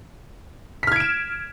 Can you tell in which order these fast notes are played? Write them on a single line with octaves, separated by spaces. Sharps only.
B6 F6 G#6 D7 E7